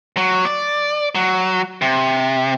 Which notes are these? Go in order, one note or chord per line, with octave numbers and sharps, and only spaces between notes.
F#3
D5
F#3
C3